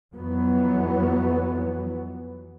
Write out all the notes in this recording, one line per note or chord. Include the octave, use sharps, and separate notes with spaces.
F2 E3 F#3 B3